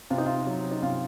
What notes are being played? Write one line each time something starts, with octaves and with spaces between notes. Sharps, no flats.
C3 F4
D#4
F4
F#3
D#4
C3 F4